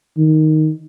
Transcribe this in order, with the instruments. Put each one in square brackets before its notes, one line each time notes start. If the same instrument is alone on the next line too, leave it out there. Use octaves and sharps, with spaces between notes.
[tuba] D#3